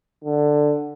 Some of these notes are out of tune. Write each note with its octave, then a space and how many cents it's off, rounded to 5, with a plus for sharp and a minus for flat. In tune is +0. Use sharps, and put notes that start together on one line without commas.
D3 +10